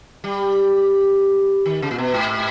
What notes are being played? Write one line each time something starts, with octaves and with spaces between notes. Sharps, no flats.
G3
D#3
C#3
A#2
B2
G#2